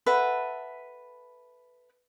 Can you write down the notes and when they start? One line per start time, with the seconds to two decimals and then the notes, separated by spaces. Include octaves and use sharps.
0.06 A4 B4 E5 F#5